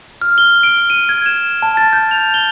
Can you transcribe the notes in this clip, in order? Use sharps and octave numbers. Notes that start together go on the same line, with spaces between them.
F6
G7
D7
D#7
G#6
E7
A5
A6
G6
F7
G7